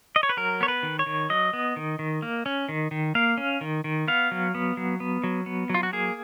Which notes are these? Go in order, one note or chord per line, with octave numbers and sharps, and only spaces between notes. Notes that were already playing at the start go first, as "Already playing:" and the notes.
D#5
C#5
B4
F#3 A#4
B3 C#5
B4
D#3
C#5
D#3
F#3 D#5
B3
D#3
D#3
A#3
C#4
D#3
D#3
A#3 F5
C#4
D#3
D#3
B3 F5
F#3
B3
F#3
B3
F#3
B3
F#3 F4
F#4
A#3 G#4